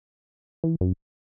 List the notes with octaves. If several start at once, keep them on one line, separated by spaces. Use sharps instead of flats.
E3
F#2